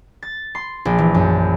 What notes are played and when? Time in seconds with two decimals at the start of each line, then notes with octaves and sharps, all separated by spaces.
0.23 A6
0.55 C6
0.85 A#1
0.98 E3
1.14 F#2